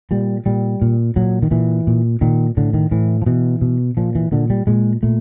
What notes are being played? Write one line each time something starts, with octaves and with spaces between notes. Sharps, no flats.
A#2 G3
A#2 G3
A#2
A#2 F#3
D#3
A#2 E3
A#2
A#2 D#3
A2 D3
D#3
A2 E3
F3
B2 E3
B2
A#2 F3
E3
A#2 D3
G3
A#2 G#3
A#2 A3